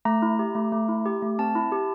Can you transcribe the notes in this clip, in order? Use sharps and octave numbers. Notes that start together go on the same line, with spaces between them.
A3 A#5
E4
G4
A3
A3
E4
G4
A3
C4 A5
E4
G4